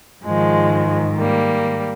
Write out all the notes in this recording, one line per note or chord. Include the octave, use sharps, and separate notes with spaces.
G#2 D#3 F3 G#3
G3 A#3